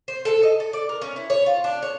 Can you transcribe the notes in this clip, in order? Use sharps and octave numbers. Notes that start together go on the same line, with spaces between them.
C5
A4
D#5
A4
D5
A#4
C#4
E4
C#5
F4
D4
C#5